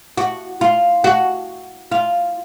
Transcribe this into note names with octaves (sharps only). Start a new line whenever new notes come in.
F#4
F4
F#4
F4